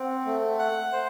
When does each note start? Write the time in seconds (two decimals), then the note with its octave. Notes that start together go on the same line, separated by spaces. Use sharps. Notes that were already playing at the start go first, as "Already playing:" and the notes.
Already playing: C4 F#5
0.26 A3
0.59 F#5
0.92 C5